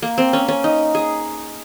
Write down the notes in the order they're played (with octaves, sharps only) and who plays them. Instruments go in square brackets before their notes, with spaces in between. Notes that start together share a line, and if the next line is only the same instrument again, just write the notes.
[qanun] A#3
C4
C#4
C#4
D#4
G#4